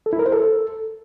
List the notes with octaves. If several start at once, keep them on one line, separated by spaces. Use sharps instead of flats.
A4
E4
A#4
C5
A4